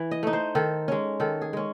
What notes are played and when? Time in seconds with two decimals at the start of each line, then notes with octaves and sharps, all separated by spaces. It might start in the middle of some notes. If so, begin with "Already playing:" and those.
Already playing: E3
0.11 D#5
0.23 A3 D#4
0.33 C5
0.55 D#3 A4
0.88 G#3 C#4
1.20 D#3 A4
1.41 G#4
1.53 G#3 C#4